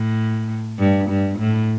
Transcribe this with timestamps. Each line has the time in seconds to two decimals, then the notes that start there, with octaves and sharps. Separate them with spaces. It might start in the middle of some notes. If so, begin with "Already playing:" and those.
Already playing: A2
0.79 G2
1.09 G2
1.39 A2